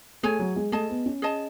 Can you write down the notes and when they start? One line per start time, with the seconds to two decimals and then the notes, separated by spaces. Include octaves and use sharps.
0.23 A3 G#4 C#5 G#5
0.39 F#3
0.56 G#3
0.72 A3 G#4 D#5 A5
0.90 B3
1.06 C#4
1.22 G#4 D#5 A5